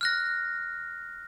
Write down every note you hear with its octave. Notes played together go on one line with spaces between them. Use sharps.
F6 F#6 A#6